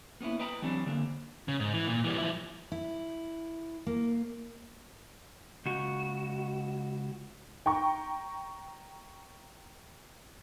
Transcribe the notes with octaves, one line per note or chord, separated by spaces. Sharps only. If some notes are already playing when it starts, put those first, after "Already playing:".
A#3 B3 C#4 E4
B4 D#5 G5 A#5 B5
E3 F#3 G3 C4 D4
D3 A#3 D4
C#3
G#2
E3
A#2
E3 G3
F3 E4
E4
A#3
C#2 F#4
G5 A#5 C#6